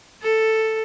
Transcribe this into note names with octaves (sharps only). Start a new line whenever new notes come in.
A4